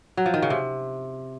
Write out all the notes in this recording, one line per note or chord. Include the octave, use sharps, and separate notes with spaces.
F#3
F3
D#3
C#3
C3